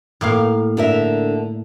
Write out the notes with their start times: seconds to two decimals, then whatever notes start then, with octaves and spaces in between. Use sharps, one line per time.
0.21 A2 A#3 F5
0.77 D3 A#4 E5